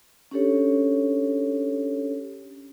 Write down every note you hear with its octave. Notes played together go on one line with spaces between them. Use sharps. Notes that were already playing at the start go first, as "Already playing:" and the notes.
C#4 D4 G4 A4 C#5